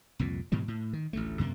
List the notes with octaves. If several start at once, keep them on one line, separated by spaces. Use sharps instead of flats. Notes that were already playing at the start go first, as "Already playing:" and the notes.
C2 F2 A#2
G#2 B2 E3 G3
A2
D#3
A1 D2 A3
F#2 C3 A3 A#3